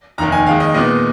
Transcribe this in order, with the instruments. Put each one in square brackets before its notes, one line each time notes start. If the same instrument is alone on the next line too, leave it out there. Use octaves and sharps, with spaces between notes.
[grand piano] F1 D#2 D#3 A#5
G#5
D#2 D#3 G#3 F5
D#5
A#2 G#3 B3 D#4 D#5